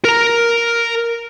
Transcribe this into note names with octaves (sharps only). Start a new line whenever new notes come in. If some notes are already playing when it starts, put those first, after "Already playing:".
A#4 A#5